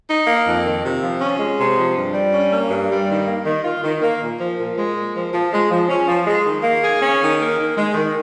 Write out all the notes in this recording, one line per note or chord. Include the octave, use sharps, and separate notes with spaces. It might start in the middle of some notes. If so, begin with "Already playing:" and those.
D#4
A#3
F2
D#3
C3
F3
C#4
G#3
C3
F3
G2
G3
C#4
A#3
G2
G3
D#3
A#3
D#3
F4
D#3
A#3
A#2
F3
A#2
G#3
A#2
F3
F3
G#3
F3
C#4
F3
G#3
D#3
A#3
G#4
C#4
D#3
A#3
D#3
G#3
D#3